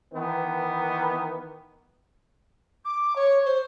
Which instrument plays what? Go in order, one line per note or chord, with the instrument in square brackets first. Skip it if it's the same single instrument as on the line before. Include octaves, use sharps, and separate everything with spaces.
[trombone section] D#3 E3 B3
[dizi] D6
C#5
C5